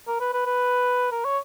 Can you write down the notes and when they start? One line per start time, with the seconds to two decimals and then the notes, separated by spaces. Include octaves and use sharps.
0.08 A#4
0.20 B4
0.33 B4
0.46 B4
1.12 A#4
1.25 C#5